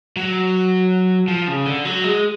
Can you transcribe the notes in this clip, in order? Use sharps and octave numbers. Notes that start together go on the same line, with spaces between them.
F#3
F3
C#3
D3
F#3
G#3